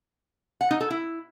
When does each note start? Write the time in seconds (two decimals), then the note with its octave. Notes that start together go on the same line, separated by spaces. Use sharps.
0.61 F#5
0.71 D#4
0.81 A4
0.90 E4